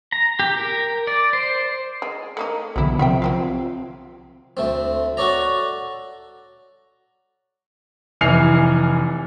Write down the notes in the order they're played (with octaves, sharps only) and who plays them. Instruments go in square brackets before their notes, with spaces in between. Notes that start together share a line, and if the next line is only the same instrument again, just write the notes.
[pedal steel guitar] A#5
G4
A#4
D5
C5
[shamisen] G#3
A3 A#3 D#4
[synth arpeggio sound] B1 D3 [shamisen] G3 E4
[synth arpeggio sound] C3 F3 [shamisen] F4 E5 G5
[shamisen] F#3 C4 F5
[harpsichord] D2 A3 C4
F#4 A4 C#5 D5 A#5
[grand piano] F1 E3 G#5 F6 C7 F7